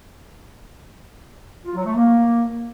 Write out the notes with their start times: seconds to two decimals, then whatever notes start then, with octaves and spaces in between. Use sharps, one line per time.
1.65 F4
1.75 F#3
1.85 A3
1.96 A#3